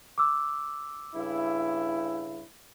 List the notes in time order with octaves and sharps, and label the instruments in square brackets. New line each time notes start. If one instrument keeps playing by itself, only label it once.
[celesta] D6 E6
[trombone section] G2 C#3 E4